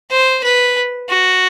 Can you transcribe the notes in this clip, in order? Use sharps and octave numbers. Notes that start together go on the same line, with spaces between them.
C5
B4
F#4